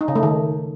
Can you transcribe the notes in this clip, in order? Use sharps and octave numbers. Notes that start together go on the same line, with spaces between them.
D#4
C#3
A3
D#3